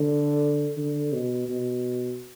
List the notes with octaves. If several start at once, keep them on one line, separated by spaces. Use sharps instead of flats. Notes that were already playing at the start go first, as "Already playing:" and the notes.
Already playing: D3
D3
B2
B2